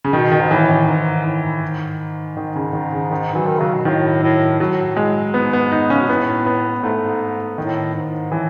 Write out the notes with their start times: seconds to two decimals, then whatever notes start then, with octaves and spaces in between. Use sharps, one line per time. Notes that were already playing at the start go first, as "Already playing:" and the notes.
0.04 C#3
0.13 B2 D#3
0.32 D#3
0.40 G#2
0.51 A2 E3
0.70 D#3
0.87 G#2
1.25 A2
1.63 G#2
2.37 D#3
2.56 C#3
2.73 D#3
2.92 C#3
3.11 D#3
3.33 E3 F#3
3.46 D#3
3.59 C#3 F#3
3.73 B2
3.85 A2 D#3
4.23 A2
4.60 A2 F#3
4.96 G#3
5.34 G#2 B3
5.53 B3
5.72 D#4
5.90 C#3 C#4
6.00 B2
6.08 A2 B3
6.46 B3
6.83 G#2 A3
6.98 G#2
7.58 A2 D#3
7.95 G#2
8.32 A2 E3